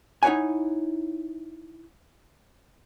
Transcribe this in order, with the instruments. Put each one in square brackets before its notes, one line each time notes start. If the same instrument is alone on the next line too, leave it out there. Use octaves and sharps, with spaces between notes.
[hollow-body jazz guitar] D#4 E4 C#5 F#5 G#5